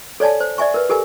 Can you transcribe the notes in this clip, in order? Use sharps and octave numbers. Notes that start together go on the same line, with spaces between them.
A4 C#5 D5 G#5 A5
C5
D5 E5 G#5 C#6
A#4 B4
G4 A4 A#4 G#5